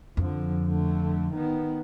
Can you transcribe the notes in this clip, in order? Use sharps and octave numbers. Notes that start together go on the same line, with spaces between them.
F2 D3 F3
D3 A3
D#3 B3